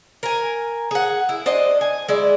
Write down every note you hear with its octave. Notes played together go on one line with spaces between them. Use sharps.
A#4 G#5
G#4 F#5
E4
D4 C5 D#5
G#5
G#3 E4 D5